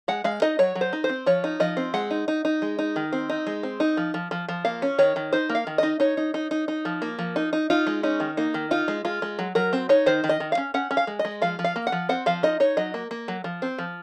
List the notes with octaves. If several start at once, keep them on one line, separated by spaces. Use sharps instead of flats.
G#3 F#5
G#3 F5
D#4 D#5
F#3 C#5
F#3
C5
D#4
C5
C4
F3 C#5
D#4
F3 D#5
C4
G#3 F#5
D#4
D#4
D#4
G#3
D#4
D#3
C4
D#4
G#3
C4
D#4
F3
F3
F3
F3
A#3 F5
C#4
D#3 C#5
D#3
D#4 C5
A#3
F5
D#3
D#4 D#5
D#4 C#5
D#4
D#4
D#4
D#4
F3
A#3
F3
D#4
D#4
D#4 F4
G#3
C#4 D#4
D#3
A#3 D#4
D#3
D#4 F4
G#3
G#3 F4
G#3
F#3
F#3 A#4
C4
D#4 C#5
D#3 C5
D#3
D#5
D#3
F5
C#4
C#4 F#5
C#4
F5
G#3
D#5
G#3
F3 F5
F3
F5
A#3
F#5
F3
C4 F#5
F3 F5
D#4 D#5
D#4 C#5
F#3 D#5
A#3
A#3
F#3
F3
C4
F3